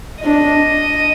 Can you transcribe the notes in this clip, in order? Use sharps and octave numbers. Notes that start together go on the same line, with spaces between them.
D4 D#5